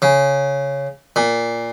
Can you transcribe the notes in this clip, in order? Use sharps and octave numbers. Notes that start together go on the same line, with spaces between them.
C#3
A#2